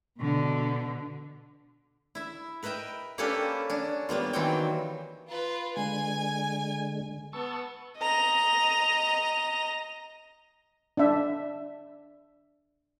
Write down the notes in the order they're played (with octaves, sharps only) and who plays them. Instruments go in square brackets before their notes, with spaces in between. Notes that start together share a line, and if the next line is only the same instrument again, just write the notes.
[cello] B2 D3
[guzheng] E4 E5
A#4 B4 D#5 E5 G5
A#3 C#4 D4 G4 A4 B4
C#4 D4
G3 A#3 B3 F4
D#3 E3 F#3 C4 F#4 G5
[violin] F4 B4
[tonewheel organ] D3 G#3 [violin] G#5
[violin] B3 [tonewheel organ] A5 C#6 E6
[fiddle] D#5 A#5
[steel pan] D4 E5